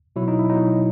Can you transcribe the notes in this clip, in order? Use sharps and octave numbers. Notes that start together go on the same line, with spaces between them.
B2 F#3 E4
D#4
E4
B2 F#3 D#4